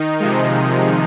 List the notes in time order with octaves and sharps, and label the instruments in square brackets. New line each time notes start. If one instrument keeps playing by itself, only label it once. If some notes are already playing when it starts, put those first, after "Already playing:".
Already playing: [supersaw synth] D#3 D#4
C3 F3 G#3